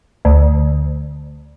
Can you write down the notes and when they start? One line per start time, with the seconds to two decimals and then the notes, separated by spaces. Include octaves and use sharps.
0.25 D2